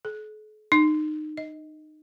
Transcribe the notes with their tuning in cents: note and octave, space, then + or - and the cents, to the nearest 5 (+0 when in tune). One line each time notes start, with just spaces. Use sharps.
A4 -45
D#4 -25
D#5 +15